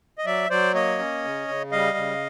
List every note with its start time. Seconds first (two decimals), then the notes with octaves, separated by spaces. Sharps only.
0.18 D#5
0.25 F#3 D5 E5
0.50 F#3 C5 D5
0.74 A#3 C#5 D#5
0.99 C#4
1.24 C#3
1.48 C#3
1.72 G3 D#5 F5
1.97 C#3